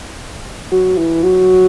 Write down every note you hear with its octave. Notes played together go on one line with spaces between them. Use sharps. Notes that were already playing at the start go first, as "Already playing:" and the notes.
F#3
E3
F#3